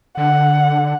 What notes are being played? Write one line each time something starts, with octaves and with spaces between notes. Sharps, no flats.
D3 F#5